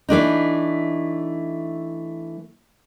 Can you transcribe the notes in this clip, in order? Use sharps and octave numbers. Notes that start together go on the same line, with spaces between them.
E3 A3 D4 D#4